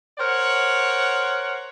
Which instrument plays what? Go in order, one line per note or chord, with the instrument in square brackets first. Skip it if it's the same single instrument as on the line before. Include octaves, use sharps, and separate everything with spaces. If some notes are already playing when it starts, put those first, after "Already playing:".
[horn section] A#4 C5 C#5 F#5